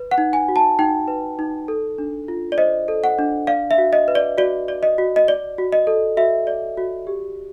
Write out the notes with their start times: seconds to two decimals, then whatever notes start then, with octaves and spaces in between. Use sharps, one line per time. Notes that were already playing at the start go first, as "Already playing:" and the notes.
Already playing: B4
0.11 F#5
0.18 D#4
0.33 G#5
0.48 F#4
0.56 A5
0.79 D#4 G5
1.08 B4
1.39 D#4
1.68 A4
1.98 D4
2.28 F4
2.52 D5
2.57 C5 D#5
2.88 A4
3.04 F#5
3.19 D4
3.47 D5 F5
3.71 E5
3.78 F#4
3.93 D#5
4.08 B4
4.15 D5
4.38 F#4 D5
4.68 D5
4.83 D#5
4.98 F#4
5.16 D#5
5.28 D5
5.58 F#4
5.72 D#5
5.87 A4
6.17 F#4 E5
6.47 D5
6.77 F#4
7.07 G4